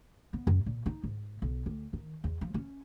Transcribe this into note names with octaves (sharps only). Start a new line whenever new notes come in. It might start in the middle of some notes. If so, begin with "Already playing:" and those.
B3
F#2
A#2
D#4
G#2
B1
D2
D#3
E2
F3
C#4